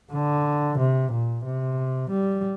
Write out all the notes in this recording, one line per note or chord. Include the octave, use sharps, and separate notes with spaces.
D3
C3
A#2
C3
G3